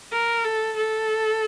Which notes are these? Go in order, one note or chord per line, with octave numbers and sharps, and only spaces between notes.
A#4
A4
A4